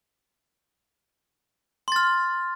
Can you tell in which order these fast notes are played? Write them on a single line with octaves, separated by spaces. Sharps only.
C6 A6 F6